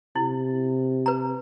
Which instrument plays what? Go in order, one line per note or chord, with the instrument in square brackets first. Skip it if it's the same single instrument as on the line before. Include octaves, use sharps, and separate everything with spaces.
[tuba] C3 [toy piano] E4
[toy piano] B4 A#5